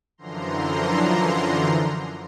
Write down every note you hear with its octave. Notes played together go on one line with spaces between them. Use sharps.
F#2 D3 E3 F3 A#5 C6